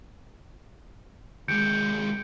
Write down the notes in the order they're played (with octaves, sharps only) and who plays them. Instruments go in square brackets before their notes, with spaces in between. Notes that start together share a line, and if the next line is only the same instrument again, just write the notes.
[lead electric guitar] D#2 G#3 [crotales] G6 C#7 D7